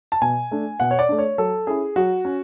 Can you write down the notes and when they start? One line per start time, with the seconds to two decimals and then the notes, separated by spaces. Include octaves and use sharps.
0.12 A5
0.21 B2 G#5
0.51 A3 D4
0.80 B2 F#5
0.91 C#5
0.99 D5
1.09 A3 D4
1.18 C#5
1.38 F#3 A4
1.67 C#4 E4 G#4
1.96 F#3 F#4
2.25 C#4